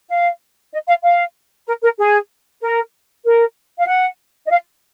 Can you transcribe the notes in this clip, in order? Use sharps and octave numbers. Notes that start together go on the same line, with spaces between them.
F5
D#5
F5
F5
A#4
A#4
G#4
A#4
A#4
F5
F#5
D#5
F5